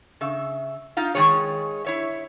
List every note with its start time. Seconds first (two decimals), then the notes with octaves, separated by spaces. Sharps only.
0.21 C#3 E5
0.97 D#4 F4 F5
1.15 D#3 E3 G#3 G#4 C#5
1.85 E4 C#5 E5